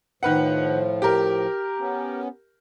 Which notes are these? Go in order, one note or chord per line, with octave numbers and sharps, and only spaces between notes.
A2 D#3 F3 B4 F#5
G4 A#4
B3 C#4